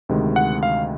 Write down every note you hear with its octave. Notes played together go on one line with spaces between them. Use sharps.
D2 C3 D#3 G#3
F#5
F5